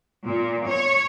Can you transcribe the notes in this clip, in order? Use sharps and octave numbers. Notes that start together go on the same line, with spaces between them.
A#2
C#5